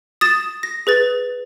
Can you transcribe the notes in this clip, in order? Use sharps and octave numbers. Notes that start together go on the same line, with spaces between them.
D#6 A6 E7
A#6
G#4 B4 A6